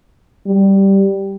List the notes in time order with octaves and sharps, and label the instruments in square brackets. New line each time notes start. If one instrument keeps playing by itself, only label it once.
[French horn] G3